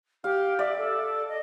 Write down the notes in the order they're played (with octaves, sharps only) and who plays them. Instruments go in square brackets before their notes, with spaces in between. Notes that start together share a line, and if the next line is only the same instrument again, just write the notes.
[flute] G4 [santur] F5
[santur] D5 [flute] E5
[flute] A4
D#5